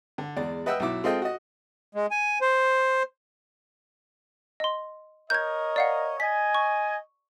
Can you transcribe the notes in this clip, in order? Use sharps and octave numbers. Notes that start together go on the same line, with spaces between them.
D3
E2 G#3 D5
B4 D#5 E5 F#5 G5 E6
B1 B2 E4 D6
G#3 C4 F4 A4 D#5 G5
F#4 D#5
G#3
G#5
C5
D#5 C6
A#4 C#5 D#5 G6 G#6
D5 F5 F#5
D#5 G#5 B6
C#6